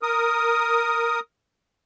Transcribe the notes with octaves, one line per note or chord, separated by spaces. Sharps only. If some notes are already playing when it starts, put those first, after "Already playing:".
A#4 D#6